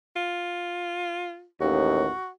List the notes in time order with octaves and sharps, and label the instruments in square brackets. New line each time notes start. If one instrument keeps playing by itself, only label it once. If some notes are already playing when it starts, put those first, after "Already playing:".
[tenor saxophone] F4
[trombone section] A1 D#2 [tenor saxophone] F#4